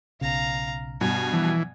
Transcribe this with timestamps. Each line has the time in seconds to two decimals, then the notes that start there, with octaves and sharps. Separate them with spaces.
0.21 B1 C#3 F5 A#5
1.01 G2 B2 G#5
1.33 E3 F3